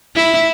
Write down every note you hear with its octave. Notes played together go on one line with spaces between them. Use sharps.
E4